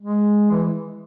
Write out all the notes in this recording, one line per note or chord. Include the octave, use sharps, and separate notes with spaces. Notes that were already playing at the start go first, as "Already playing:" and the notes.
G#3
E3